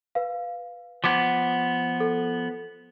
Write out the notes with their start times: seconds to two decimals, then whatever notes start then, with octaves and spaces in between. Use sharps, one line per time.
0.15 B4 F5
1.04 F3 B3 D6 G#6 D7
2.00 A4